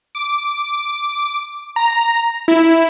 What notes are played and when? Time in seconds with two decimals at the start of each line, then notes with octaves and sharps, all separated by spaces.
0.15 D6
1.76 A#5
2.48 E4